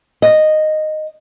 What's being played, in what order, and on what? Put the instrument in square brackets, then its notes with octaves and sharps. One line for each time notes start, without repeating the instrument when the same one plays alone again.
[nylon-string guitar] D#5